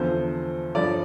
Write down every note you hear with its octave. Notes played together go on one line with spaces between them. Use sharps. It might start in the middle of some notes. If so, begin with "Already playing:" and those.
Already playing: E2 D3 F3 C5
G2 F3 D5